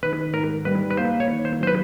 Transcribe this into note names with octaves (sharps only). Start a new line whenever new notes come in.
D#3 B4
G#2 A#4
G3 B4
B4
A#3 C5
C#5
D#3
C5
F#3 C5
B4